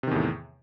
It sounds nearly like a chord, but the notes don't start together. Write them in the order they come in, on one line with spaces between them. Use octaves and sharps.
C3 D#3 E2 A2